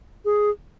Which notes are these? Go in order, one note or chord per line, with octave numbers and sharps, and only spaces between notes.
G#4